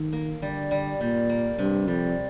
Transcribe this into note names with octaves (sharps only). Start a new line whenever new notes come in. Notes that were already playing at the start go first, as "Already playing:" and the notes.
Already playing: D#3
A#3
D3 G3
G3
A#2 G3
A#3
G2 C3
F2 G3